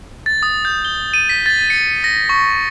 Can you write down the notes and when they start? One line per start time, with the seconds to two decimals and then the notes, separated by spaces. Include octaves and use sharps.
0.26 A6
0.43 D#6
0.65 G6
0.85 G7
1.14 D#7
1.29 B6
1.46 A6
1.70 C#7
2.04 A#6
2.29 C#6